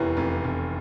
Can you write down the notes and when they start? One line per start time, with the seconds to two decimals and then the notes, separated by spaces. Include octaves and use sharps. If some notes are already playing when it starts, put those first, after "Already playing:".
Already playing: F1 E2 E3 G4 A#4 C#5
0.17 F1
0.44 F1